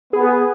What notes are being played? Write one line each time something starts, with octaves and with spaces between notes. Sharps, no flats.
B3 G#4